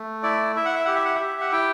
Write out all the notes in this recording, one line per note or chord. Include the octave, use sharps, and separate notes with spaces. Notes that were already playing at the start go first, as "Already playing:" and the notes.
Already playing: A3
E4 D5
E4 E5
F#5
E5
G4 F#5
E5
F#5
E5
G4
F#5
E4 G5